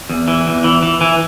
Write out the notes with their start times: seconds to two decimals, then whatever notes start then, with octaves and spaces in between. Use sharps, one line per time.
0.09 E2
0.28 E3
0.47 E2
0.64 E3
0.83 E3
1.01 E3